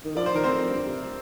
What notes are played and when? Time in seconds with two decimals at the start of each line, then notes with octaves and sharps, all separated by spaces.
0.05 D#3
0.16 F3 D5
0.26 C5
0.34 D#3 A#4
0.44 C4 C5
0.51 F2
0.68 G2
0.86 C3